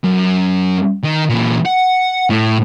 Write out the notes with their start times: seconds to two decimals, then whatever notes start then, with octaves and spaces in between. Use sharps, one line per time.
0.04 F#2
1.04 D#3
1.29 A#2 E3
1.65 F#5
2.30 A2